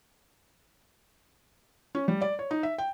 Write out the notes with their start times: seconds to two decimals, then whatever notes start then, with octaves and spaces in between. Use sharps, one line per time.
1.95 C#4
2.08 G3
2.21 D5
2.39 C#5
2.51 D#4
2.63 E5
2.78 G5